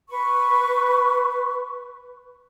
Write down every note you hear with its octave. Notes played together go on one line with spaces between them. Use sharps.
B4 C#6